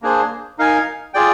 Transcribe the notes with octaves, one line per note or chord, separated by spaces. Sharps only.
A#3 D4 G#4 C5
D#4 A#4 F5 G#5
F4 G#4 D5 G5